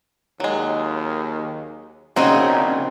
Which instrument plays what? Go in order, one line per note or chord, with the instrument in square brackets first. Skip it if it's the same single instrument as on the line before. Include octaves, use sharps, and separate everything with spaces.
[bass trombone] D#2 [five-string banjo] F#3 G#3
[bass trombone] A#1 [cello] C#3 [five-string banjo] A#3 F#4 D#5 [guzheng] C4 D#4